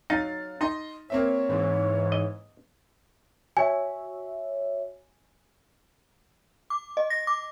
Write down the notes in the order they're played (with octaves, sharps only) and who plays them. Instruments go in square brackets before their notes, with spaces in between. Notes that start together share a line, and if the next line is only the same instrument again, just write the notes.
[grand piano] F#3 F5 A6 [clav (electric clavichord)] D#4
[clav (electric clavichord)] D#4 [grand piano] D#5 C6
[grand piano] A#3 C4 E5 [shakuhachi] C#5
[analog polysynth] G#2 E3
[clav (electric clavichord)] D#5
[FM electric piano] F#4 C#5 E5 [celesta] G#5
[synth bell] D6
D#5
A#6
D6